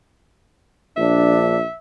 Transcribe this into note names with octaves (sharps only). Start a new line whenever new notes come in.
A#1 D4 E5